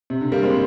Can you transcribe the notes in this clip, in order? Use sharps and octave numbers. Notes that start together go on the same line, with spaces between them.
C3
D3
G3 A#3
G#3 C4